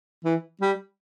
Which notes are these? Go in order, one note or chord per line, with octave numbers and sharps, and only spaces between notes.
E3
G3